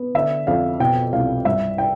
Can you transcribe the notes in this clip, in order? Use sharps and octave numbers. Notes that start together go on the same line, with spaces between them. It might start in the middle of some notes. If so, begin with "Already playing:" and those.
Already playing: B3
D3 E5
F2 F5
B2 G5
C2 F5
G2 E5
G5